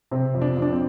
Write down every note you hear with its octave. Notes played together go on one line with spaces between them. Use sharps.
C3 C4
F2
D4
F2 D4
C4